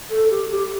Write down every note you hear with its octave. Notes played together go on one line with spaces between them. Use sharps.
A4
G4
G4